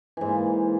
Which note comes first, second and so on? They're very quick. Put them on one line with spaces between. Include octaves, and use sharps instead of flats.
E3 G#2 A#3